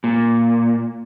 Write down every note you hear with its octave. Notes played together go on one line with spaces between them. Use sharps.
A#2